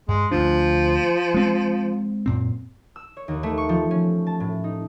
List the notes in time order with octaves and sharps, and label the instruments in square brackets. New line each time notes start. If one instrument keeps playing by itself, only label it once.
[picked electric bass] G2 [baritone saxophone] G#3
[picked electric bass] D2 D4 [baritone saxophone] F3
[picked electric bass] G#3 C4
F#2 A#2 C4
[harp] E6
C#5
D#2
A3
C#6
F3
C#4
A5
A2
D#4